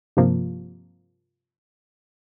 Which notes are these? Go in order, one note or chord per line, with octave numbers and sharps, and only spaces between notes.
G2 C3 F3 A#3